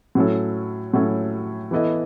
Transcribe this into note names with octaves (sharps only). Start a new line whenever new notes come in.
A2 F#3 C#4 E4 A4
A2 F#3 C#4 E4 A4
E3 B3 E4 A4 D#5